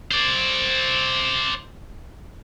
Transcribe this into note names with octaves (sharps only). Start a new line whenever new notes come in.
C5 D5